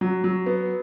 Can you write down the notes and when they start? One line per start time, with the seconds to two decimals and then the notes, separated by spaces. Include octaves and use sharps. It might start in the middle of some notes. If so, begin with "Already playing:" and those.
0.01 F#3
0.24 F#3
0.46 B3